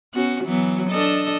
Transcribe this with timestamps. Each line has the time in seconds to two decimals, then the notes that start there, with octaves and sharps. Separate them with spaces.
0.14 B3 C#4 F#4
0.44 E3 F#3 B3
0.90 D4 A4 D#5